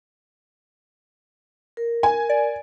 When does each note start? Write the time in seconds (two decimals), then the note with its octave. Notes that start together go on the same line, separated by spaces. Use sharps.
1.77 A#4
2.03 G#5
2.29 D5